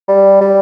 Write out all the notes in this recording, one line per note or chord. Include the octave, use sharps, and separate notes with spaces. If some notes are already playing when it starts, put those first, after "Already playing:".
G3
G3